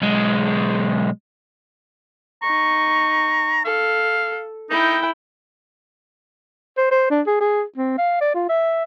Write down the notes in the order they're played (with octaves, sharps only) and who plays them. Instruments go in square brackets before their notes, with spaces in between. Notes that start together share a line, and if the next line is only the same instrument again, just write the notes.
[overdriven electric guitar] B1 G#3
[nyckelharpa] D#4 C#6 [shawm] A#5
[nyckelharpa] A4 [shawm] F5
[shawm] D#4 [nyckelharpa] E4 G5
[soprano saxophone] C5
C5
D4
G#4
G#4
C4
F5
D5
F4
E5